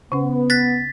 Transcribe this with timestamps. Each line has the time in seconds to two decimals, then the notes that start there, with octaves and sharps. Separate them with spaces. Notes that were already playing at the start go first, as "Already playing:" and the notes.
0.12 C#3 B3 C#4
0.50 F#6 A6 B6